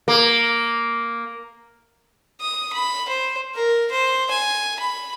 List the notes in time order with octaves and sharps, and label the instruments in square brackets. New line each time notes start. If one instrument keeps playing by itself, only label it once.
[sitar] A#3
[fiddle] D#6
B5
C5
A#4
C5
G#5
B5